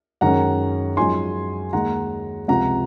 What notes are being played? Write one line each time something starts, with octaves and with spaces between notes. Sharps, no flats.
F#2 D#3 G#3 C#4 F#5 A#5
F#2 F3 G#3 D#4 G#5 C6
D#2 D#3 G#3 D#4 F#5 A#5
C#2 C3 F3 C4 F#5 A#5